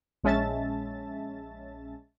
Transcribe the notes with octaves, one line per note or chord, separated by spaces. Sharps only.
A#1 G#3 C#4 E5 A5 A6